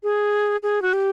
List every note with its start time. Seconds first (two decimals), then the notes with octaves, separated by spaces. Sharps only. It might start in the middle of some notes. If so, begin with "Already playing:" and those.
0.03 G#4
0.63 G#4
0.82 F#4
0.93 G4